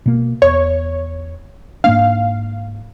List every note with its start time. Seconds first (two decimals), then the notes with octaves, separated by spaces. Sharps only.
0.06 B2 A#3
0.42 E2 C#5
1.84 G#2 A#3 D4 F5